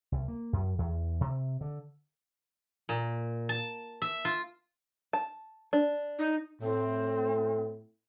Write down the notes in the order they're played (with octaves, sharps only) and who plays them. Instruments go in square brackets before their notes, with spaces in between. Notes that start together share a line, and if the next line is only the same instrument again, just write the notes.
[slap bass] C2
A#3
F#2
E2
C3
D3
[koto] A#2
A5
E5
F4
[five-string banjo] A5
D4
[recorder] D#4
[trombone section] A2 [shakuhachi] C4